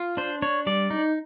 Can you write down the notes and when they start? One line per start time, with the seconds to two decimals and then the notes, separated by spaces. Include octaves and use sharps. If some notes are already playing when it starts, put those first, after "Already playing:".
Already playing: F4
0.17 D4 C5
0.42 D4 C#5
0.67 G3 D5
0.90 D#4